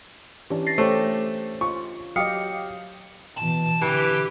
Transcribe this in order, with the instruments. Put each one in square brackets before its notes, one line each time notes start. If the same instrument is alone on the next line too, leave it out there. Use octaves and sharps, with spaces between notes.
[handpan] E3 C#4 D4 [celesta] G4
[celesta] A6 A#6 C7
[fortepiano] A3 [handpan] G4 [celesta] C5 C#5
[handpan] F4 [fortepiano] C#6
[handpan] F#3 G4 D#5 [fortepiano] F5 [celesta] G5 D#6 C#7
[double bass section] B2 E3 [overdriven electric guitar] A5
[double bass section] D3 [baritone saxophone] E3 [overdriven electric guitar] G4